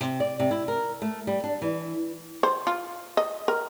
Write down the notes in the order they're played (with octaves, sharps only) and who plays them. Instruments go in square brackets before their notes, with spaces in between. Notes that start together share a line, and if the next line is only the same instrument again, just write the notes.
[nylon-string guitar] C3
D5
C3
E4
A#4
A3
G3
D4
E3
[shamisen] C5
F4
D#5
A#4